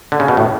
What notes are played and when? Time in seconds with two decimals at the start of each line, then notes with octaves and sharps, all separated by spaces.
0.12 D3
0.20 C#3
0.28 B2
0.37 A2